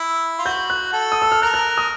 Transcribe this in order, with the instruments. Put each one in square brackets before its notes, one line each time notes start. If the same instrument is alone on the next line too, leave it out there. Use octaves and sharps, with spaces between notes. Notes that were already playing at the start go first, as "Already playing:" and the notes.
Already playing: [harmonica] E4
F4
[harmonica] F#4 [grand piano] G6
[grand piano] F#6
[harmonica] A4
[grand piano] D#6
E6
F6
[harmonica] A#4 [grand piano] F#6
[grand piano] F#6
D#6